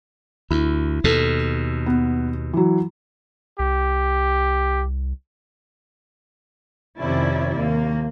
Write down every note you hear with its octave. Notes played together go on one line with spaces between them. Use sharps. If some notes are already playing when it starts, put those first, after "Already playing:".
D2 E4
D#2 B2 A4
B3
E3 F#3
C2 G4
F2 C3 D#3 C#4 E4 D5
D#2 A#3